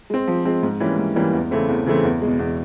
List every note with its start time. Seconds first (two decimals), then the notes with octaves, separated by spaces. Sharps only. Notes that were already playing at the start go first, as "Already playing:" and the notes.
0.10 G#3 C4
0.28 F3
0.45 G#3 C4
0.63 G#2
0.80 E3 G3 A#3 C#4
0.98 G#2
1.16 E3 G3 A#3 C#4
1.33 E2
1.51 C#3 E3 A3 C4
1.69 E2
1.86 C#3 E3 A3 C4
2.04 E2
2.22 B2 G#3
2.39 E2